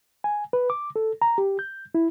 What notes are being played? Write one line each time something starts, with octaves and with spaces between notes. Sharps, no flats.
G#5
B4
D6
A4
A#5
G4
G6
E4